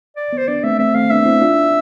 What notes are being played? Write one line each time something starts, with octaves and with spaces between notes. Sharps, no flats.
D5
B3
C5
B3 D4 D5
A3 C4 E5
A3 C4 E5
A3 C4 F5
B3 D4 E5
C4 E4
D4 F4